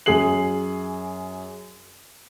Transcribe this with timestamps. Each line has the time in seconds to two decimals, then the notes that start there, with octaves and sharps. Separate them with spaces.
0.06 F#2 G#4 C7 F#7